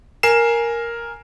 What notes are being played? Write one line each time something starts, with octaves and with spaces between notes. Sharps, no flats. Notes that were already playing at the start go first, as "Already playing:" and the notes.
A#4 G#5 C7 E7